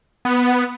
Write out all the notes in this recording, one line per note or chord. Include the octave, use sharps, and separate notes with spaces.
B3